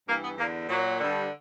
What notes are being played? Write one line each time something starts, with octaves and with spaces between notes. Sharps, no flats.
G2 E3 A#3
B3
E2 D3 A#3
A#2 F#3
G2 D3